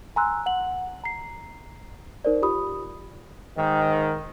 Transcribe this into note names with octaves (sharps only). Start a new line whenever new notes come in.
G#5 A#5 C6 E6 F#6
F#5 F#7
A#5 C7
D#4 A#4 C5 D5
F4 G4 B5 D#6
G#2 D#3